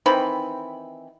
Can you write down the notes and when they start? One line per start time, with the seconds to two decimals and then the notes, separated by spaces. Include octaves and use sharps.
0.06 D#3 E3 C4 B5